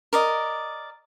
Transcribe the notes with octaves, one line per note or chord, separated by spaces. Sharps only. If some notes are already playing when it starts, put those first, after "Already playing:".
A#4 D5 D#5